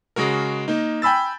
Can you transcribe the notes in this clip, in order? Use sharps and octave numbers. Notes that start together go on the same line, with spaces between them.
C#3 G#3 F#4 A#4
A#3 D#4
G5 G#5 B5 E6 A6